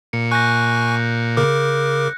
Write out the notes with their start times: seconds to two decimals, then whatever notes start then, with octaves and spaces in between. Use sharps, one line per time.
0.13 A#2 C#7
0.31 G#5 C#6 F#6 G6 A#6
1.37 C#3 A#4 D6